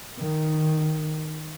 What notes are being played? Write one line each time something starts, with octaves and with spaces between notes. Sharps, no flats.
D#3